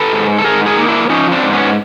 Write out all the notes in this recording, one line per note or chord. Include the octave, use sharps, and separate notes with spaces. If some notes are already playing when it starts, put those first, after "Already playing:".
Already playing: A4 B4
G#2
A4
G#2 G#4 A#4
G#4 A#4
A#3 D#4
D4 E4
F3 C#4 D#4
C4 D4
G#2
B3 C#4